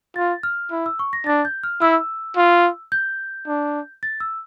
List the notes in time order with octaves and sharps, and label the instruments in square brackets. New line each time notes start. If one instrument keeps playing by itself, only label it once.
[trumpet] F4 [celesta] A6
[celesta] F6
[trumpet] E4
[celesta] E6
C#6
A#6
[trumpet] D4 [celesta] A6
[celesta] G6
F6
[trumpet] E4 [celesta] E6
[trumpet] F4
[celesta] G6
[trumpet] D4
[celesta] A6
E6